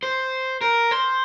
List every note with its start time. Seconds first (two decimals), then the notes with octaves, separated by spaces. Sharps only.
0.03 C5
0.61 A#4
0.91 C5